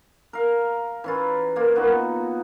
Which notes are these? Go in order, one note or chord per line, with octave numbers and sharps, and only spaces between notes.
A#4 F5
E3 C#4 F4
A#3 F4
A#2 B3 D#4 F#4